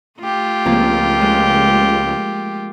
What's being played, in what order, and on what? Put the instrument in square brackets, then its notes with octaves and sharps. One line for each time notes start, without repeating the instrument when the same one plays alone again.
[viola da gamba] A3 F4 G4
[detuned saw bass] C#2 [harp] F3 A#3 C4
[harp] G#3